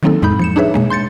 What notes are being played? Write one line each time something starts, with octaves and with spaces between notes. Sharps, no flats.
D#3 F#3 A#3 C4 D#4 A4
F2 A2 G#3 D#4 B5 G6
F3 C#7 E7
D4 D#4 G#4 B4 C#5 E5
B2 G#3 A#3
C6 G6 A6 C#7